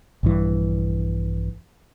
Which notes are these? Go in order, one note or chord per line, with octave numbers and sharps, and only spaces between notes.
A#1 G2 E3